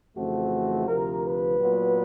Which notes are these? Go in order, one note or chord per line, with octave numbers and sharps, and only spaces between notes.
F2 C#3 E3 A3 C4 F#4
D2 C3 F3 A#4
B4
A#2 F#3 B3